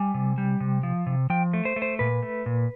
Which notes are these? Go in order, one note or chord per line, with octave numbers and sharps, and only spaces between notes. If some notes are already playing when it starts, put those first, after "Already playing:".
Already playing: G3 G#5
C3
G3
C3
F3
C3
F3 G5
A3
C5
A3
C5
A#2 B4
A3
A#2